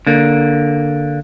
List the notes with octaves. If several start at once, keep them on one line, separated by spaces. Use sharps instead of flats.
D3 A#3